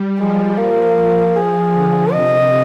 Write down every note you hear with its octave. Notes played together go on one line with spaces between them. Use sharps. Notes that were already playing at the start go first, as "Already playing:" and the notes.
Already playing: G3
F3 G#3
A#3
F3 G#4
D3
C3 D#5